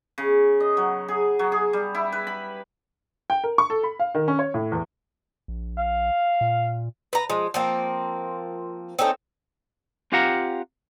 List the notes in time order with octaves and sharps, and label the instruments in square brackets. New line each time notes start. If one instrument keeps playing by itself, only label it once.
[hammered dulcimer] C#3
D#5
F#3
G#4
F#3
G#4
G3
E4
B4
B5
[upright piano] G5
A#4
C#6
A4
B5
F5
D#3
C#4
C#5
A2
E2
[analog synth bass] A#1
[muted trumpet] F5
[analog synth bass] A#2
[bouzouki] B4 A#5
F3 G#3
F3 A#3 C4
C4 C#4 D#4 A4
[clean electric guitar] C4 F4 G4 F5 F#5 A#5